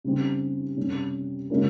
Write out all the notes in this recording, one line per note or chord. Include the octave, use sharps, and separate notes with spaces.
C#3 G3 C4
C3 G3 C#4
C#3 G#3 C#4 F4 A#4